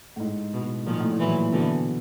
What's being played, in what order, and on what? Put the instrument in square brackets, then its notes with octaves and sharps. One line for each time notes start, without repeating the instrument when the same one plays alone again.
[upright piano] A2
G#2
[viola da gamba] B2
[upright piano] A#2 [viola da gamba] D#3 F3
[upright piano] A2
A#2
[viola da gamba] E3 F#3
[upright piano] B2 [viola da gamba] D3 E3